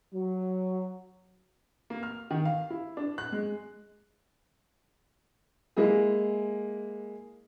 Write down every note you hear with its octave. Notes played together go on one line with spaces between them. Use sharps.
F#3
A#3
F6
D#3
F5
E4
D4
F#6
G#3
G#3 A#3 E4 G#4